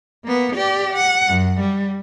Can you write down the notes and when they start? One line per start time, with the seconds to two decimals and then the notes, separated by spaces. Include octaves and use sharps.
0.24 A#3 B3
0.56 G4 D5
0.94 F#5
1.28 F#2
1.60 G3